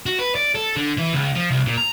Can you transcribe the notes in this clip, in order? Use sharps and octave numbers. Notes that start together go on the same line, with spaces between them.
F#4
B4
D5
A4
D3
E3
C#2
F3
C2
A#2
A#5